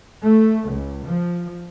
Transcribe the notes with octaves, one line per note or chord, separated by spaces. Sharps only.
A3
C#2
F3